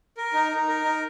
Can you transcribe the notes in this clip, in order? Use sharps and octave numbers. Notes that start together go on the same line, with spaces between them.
A#4
D#4
D#4
A#4
D#4